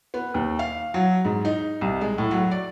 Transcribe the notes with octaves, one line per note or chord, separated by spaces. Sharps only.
B3
D#2
F5
F#3
G#2
D#4
C2
G#3
A2
F#3
D5